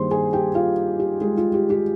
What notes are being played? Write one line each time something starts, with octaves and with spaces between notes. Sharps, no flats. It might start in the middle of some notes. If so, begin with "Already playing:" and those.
Already playing: G2 D#3 A#3 D#4 G#4 C5 C6
G#4 G#5
G4 G5
F4 F5
G4
G#3 G#4
F4
G4
G4